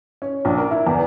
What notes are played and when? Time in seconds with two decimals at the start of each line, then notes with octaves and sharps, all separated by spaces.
0.22 C#4
0.45 A#1
0.57 A#4
0.71 E4
0.87 E2